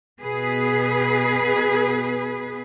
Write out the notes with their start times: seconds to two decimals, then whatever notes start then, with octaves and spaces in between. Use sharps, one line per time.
0.20 B2 G#4 B4